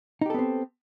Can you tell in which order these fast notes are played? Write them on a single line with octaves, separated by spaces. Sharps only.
D#4 G4 A4 B3 C4